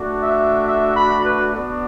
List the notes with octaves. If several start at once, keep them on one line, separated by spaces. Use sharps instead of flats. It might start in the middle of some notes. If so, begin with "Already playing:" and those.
Already playing: A3 D4 F#4
E5
E5
B5
B4
B3 D4 F#4